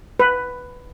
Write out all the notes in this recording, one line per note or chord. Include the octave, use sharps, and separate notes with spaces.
B4